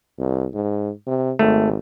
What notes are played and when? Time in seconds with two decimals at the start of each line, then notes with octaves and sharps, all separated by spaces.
0.19 C2
0.54 G#2
1.07 C3
1.39 G#1 A3